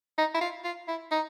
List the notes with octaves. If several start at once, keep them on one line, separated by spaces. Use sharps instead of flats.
D#4
E4
F4
F4
E4
D#4